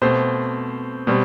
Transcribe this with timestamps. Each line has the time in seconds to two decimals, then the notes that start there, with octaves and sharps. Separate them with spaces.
0.02 B2 A3 C4 C5
1.07 B2 G3 C4